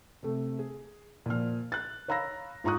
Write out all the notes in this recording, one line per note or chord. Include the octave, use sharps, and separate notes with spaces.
C3 A3
G#4
A#2 F3 F6
F#6 A6
C#5 F5 A#5 B5 E6 A#6
G#2 F4 A#5 C#6 D#6 F#6